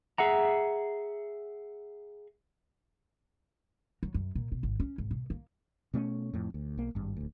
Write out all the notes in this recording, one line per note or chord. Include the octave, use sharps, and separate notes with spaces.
G#4 E5 F#5 A#5
F#3
F#2
A#2
B2
G#1
C#4
G#1
B2
A#3
B2 A3 C4 C#4
F2 A2
D2
B1 A#3
G#1 G2
D1 D2